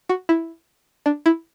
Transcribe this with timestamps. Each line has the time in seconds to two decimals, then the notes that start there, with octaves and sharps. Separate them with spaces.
0.09 F#4
0.29 E4
1.06 D4
1.26 E4